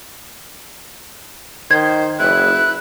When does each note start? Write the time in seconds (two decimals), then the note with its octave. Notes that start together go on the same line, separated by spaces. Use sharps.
1.71 D#3 C5 G#6
2.19 F#1 E4 B4 F#6